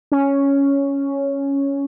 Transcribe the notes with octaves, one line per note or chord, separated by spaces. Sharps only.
C#4